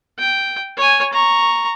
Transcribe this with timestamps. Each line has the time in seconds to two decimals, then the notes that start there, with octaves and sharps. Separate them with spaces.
0.19 G5
0.77 C#5 G#5
1.13 A#5 C#6